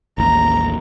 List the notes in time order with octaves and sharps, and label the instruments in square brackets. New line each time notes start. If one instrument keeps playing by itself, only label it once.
[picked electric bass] A1 D#2 [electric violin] A#5